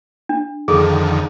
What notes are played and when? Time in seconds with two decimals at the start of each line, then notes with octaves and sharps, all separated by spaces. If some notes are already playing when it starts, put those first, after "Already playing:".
0.29 D4
0.68 F2 D3 D#3 G#4 A4